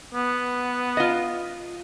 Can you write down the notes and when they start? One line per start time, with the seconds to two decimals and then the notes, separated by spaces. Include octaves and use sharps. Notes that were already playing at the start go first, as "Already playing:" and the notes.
0.14 B3
0.97 F4 D#5